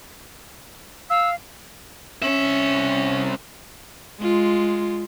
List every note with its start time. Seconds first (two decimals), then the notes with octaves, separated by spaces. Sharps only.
1.10 F5 E6
2.22 C2 C#4 E5
4.20 G#3 F4